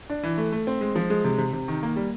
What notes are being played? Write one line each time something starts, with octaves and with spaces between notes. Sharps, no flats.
D4
E3
A3
A3
C4
G#3
F3
G#3
C3
C3
C3
D#3
A#3
G3